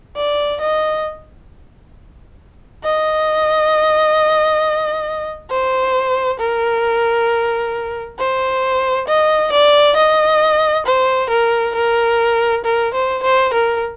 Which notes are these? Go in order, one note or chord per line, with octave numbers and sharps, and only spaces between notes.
D5
D#5
D#5
C5
A#4
C5
D#5
D5
D#5
C5
A#4
A#4
A#4
C5
C5
A#4